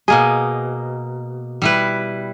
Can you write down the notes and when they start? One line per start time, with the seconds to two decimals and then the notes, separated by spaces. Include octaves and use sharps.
0.08 B2 A#3 G#4 D#5
1.62 G3 E4 B4